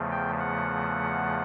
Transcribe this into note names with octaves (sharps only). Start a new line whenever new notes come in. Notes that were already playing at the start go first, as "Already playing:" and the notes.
Already playing: E2 C#3 F3 A3
G5
F#5